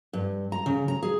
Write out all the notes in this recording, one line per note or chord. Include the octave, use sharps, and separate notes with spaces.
G2
A#5
C#3
A#5
G#4